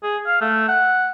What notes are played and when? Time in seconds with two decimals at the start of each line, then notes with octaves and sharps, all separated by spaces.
0.03 G#4
0.27 F5
0.41 A3
0.68 F#5